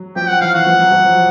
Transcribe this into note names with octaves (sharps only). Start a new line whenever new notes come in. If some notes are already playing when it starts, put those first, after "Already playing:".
Already playing: F#3
F3 G5
F#5
E3 F5
F#5
F3
F#3
F3
F#3